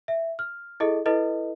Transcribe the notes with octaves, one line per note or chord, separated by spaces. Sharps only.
E5
F6
E4 G#4 A4 D#5
E4 A4 B4 D#5